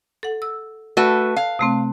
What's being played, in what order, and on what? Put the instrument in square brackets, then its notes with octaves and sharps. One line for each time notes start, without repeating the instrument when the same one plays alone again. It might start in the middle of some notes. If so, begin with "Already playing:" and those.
[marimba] A4 F#5
E6
[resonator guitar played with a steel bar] A3 F#4 B4
F5
[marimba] C3 A3 C4